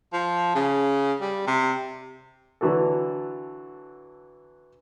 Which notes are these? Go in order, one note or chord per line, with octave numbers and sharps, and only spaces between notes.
F3
C#3
G3
C3
D3 E3 F#3 F#4 A4